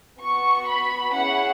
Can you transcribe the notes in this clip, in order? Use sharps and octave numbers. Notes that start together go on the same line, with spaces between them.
B3 F#4 C#6
B5
C#4 E4 G#4 F#5